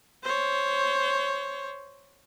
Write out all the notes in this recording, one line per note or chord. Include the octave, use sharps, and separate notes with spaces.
C5 C#5